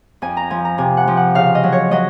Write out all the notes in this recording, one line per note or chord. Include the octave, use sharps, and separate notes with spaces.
F2 G#5
A#5
F3 G#5
A#5
C3 G#5
F#5
F3
F#5
C#3 F5
D#5
F#3
C#5
F#3 D#5